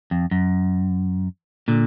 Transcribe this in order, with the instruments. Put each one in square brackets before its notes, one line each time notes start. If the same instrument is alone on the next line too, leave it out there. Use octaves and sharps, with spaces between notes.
[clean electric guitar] F2
F#2
A#2 D3